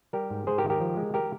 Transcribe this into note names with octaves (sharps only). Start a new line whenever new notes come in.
G3 G4 A#4
G#2
G#2 G#4 C5
G4 A#4
D#3
G4 A#4
F3
G#3
G4 A#4